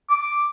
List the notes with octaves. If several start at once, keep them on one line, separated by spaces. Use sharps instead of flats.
D6